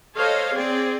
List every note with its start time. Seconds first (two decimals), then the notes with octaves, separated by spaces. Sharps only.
0.17 A4 C5 C#5 D#5 F5
0.54 C4 G#4 D5